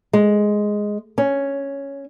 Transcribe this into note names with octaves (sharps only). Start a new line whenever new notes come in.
G#3
C#4